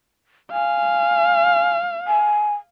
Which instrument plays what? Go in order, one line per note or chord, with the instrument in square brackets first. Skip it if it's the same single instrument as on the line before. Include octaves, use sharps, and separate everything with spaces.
[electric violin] F5 [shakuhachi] G#5
[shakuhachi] G#5